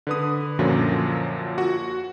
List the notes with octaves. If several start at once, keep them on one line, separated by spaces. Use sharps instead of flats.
D3 B4 D#6
F#2 A#2 D3 F3 F#3
F#4